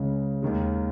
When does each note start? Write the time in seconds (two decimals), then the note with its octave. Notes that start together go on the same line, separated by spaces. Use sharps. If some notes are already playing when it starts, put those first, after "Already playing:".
Already playing: C#2 C#3 G#3
0.42 D#2 D#3 G#3